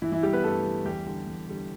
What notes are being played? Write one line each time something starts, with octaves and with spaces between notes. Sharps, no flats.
G2 E3 E4
E3 E4
E3 G3 G4
B3 B4
G2 A3 A4
E3 G3
E2 G3 G4
D3 G3
E2
D3 G3